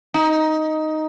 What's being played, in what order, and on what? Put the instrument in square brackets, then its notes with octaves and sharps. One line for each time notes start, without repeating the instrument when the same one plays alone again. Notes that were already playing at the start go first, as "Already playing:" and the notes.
[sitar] D#4